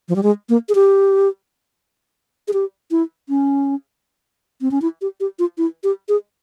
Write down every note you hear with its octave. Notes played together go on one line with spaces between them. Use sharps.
F3
G3
G#3
A#3
G#4
G4
G#4
G4
E4
C#4
C4
C#4
E4
G4
G4
F4
E4
G4
G#4